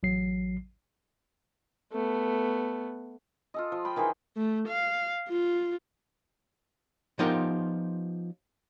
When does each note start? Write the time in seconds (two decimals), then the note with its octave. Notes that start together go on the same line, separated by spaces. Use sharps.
0.03 A1 F#3 C7
1.92 A3 B3
3.54 F4 A4 D#5
3.72 F3
3.85 G5 B5
3.96 D#3 E3 G#4 C5
4.36 A3
4.68 F5
5.29 F4
7.19 F3 B3 D#4 F4 G4 A#4